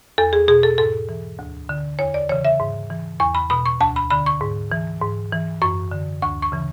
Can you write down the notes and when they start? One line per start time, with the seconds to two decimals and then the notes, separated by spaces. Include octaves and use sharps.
0.18 E2 A4
0.33 G#4
0.48 B2 G#4
0.63 A4
0.78 G#2 A4
1.09 E3
1.39 D2
1.69 D3
1.99 E2 C#5
2.14 D5
2.29 C#3 E3 C#5
2.45 E5
2.60 G#2
2.90 E3
3.20 E2 C#6
3.35 B5
3.50 B2 B5
3.66 C#6
3.81 D2 A5
3.96 B5
4.10 D3 B5
4.26 C#6
4.41 G#2
4.72 E3
5.02 G#2
5.32 E3
5.62 F#2 C#6
5.91 D3
6.22 D2 C#6
6.42 C#6
6.52 C#3 E3